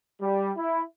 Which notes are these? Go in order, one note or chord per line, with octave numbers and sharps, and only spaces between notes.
G3
E4